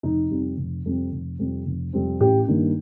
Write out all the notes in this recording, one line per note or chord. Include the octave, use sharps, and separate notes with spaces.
F1 D#4
F2 C3 G3 C4
F1
F2 C3 G3 C4
F1
F2 C3 G3 C4
F1
F2 C3 G3 C4
A1 G4
G2 D#3 A#3